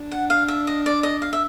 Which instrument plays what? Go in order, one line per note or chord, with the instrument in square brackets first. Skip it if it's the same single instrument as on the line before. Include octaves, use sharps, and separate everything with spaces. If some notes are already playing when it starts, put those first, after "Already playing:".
Already playing: [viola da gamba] D4
[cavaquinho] F#5
F5
E5
D#5
D5
D#5
F5
E5